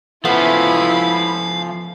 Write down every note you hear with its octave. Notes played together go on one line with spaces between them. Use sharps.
F3 A3 B3 C#4 E4 F5 B5